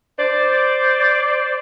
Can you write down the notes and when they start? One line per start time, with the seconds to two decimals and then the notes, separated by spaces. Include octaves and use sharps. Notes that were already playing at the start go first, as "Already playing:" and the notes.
0.19 C5 D5